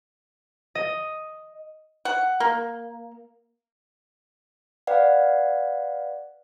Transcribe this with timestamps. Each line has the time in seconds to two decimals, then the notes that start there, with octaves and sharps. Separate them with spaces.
0.75 D#5
2.05 F#5
2.40 A#3
4.87 B4 D5 F5 F#5